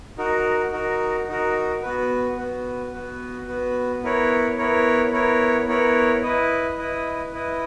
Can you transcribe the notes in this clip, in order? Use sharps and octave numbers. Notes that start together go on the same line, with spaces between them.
D#4 F#4 A#4
D#4 F#4 A#4
D#4 F#4 A#4
B3 F#4 B4
B3 F#4 B4
B3 F#4 B4
B3 F#4 B4
B3 E4 A#4 C#5
B3 E4 A#4 C#5
B3 E4 A#4 C#5
B3 E4 A#4 C#5
E4 B4 D#5
E4 B4 D#5
E4 B4 D#5